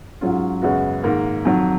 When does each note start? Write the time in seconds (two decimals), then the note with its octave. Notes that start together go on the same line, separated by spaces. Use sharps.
0.21 G#2 F#3 C#4 F4
0.62 F#2 C#3 G#3 B3 F#4
1.04 G#2 D#3 A#3
1.45 F2 D#3 F#3